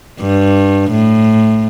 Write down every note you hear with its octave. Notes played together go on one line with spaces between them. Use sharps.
G2
A2